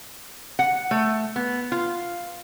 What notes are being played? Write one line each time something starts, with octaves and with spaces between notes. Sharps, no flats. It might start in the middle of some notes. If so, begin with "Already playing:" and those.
F#5
A3
B3
F4